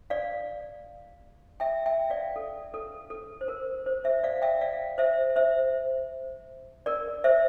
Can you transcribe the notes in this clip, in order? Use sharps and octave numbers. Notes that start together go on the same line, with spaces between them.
D5 F5
E5 G5
E5 G5
D5 F5
A4
A4
A4
C5
A#4
C5
C5 E5
D5 F5
E5 G5
D5 F5
C5 E5
C5 E5
A#4 D5
C5 E5